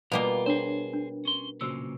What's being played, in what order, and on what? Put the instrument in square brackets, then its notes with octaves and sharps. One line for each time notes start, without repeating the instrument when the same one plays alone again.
[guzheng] B2 G3 A#3 [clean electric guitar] F4 A#4 [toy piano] F5
[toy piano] D4 C#5 [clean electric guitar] G#4 C5
[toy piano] D4
[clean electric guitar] C#4 C6
[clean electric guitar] B1 A#2 C#3 [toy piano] F#4 C5 E6